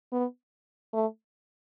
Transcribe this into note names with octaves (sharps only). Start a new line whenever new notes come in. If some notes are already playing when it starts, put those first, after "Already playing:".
B3
A3